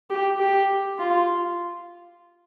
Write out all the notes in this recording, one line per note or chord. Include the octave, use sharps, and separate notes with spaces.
G4
G4
F4